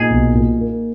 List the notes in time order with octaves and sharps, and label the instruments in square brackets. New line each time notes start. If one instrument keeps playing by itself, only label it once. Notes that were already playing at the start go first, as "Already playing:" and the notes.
Already playing: [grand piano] A#2 [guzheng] D#4 G#4
[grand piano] B1
A#2
A#3